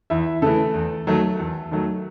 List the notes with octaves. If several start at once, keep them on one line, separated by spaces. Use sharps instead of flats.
E2 E4 E5
C#3 E3 A3 A4
E2
D#3 F#3 A3
E2
D#3 F#3 A3